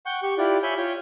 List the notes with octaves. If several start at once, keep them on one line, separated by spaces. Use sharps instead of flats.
F#5 G5 C#6 G6
G4 C#6
E4 F4 G4 D5 F#6
C#5 E5 G#5 B5 G6
F4 C#5 G5